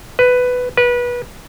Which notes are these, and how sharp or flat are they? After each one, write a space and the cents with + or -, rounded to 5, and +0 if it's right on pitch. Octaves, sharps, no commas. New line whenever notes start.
B4 +10
B4 -25